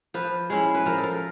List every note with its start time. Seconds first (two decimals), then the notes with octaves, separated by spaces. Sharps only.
0.14 F3 B4
0.50 G#3 C#4 E4
0.75 B4
0.86 F3 A#4
0.98 A4
1.04 A#4